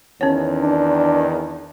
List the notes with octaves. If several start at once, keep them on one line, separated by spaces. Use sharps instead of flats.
E2 D#3 C#4 C#5
D4